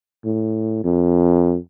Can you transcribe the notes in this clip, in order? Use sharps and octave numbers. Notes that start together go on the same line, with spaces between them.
A2
F2